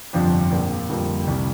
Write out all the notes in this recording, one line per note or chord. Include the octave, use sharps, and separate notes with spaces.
G1 F2 C3 F3 D4
A#1 A#2 A#3
F2 D3 G3 A#3 F4
C2 C3 G3